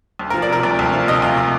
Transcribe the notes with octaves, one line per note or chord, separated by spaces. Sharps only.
D2
A#4
F3
D5
C3 A#4
D2 D5
D2
F3
C3 D#5
D2 F5
D6